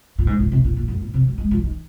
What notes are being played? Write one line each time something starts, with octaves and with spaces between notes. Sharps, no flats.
A#2
G#2
A#2
C3
A#2
A#2
F#2
A#2
C3
F#3
G#3
F3
D#3